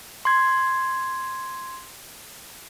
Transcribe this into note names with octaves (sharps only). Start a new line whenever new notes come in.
C6 G#6